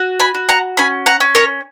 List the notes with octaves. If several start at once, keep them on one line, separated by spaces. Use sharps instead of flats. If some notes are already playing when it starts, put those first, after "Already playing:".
Already playing: F#4
G#5 B5
F#4
F#5 A#5
C#4 G#5 B5
F#5 A#5
C#4
A#4 C#5